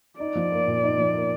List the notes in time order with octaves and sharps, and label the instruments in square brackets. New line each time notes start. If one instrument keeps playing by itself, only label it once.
[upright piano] D#4 [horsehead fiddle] D5
[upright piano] F3
A#3
A#2
D#4
F3
A#3